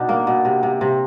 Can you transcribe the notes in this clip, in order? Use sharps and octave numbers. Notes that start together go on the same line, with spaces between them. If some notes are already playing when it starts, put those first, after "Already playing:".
Already playing: B2 D4 D#4
A#3
B2
C3
C3
C3